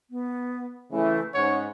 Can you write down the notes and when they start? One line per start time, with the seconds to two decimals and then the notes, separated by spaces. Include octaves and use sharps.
0.10 B3
0.92 C#3 E3 A3
1.34 G#2 C#4 D#4 C#5 F#5